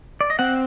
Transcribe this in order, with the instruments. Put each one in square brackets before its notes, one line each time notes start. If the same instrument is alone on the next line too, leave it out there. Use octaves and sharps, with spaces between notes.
[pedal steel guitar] D5
D#5
[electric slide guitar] C4 [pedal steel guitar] F#5